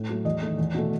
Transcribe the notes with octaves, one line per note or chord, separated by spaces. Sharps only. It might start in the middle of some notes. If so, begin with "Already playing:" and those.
Already playing: A2
F#3 A3
E2 D#5
D#3 A3
E2
B2 A3